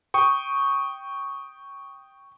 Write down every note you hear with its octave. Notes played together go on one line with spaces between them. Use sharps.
G5 C#6 D#6